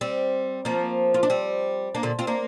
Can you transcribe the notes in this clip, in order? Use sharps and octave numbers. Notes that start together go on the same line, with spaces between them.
G3 C4
F3 A#3
F4
D4
G3 C4
A#3 D4
A#2 D3
C4 F4
A#3 D4